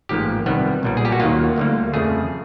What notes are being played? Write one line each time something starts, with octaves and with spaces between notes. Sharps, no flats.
A1 G#2 F3 A#3 G4
C2 C3 D#3 G3 B3
B1 A#2 G3
G#4
G4
F#4
D#2 D#3 F#3 A#3 F4
D2 D3 G3 A#3
F2 C#3 F3 A3 G#4